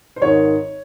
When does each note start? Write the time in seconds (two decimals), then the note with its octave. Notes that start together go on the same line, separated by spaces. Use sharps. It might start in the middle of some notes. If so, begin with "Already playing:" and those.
0.16 C5
0.21 G#1 G#2 D#3 C#5